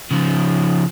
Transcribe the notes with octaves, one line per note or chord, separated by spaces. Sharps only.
C#3 F3